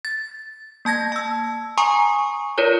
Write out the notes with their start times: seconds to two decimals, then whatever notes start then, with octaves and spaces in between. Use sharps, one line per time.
0.05 A6
0.85 A#3 A5 G#6 A#6
1.12 A5 E6
1.78 G#5 A#5 C6 C#6 D#6
2.58 F4 A#4 B4 C#5 D5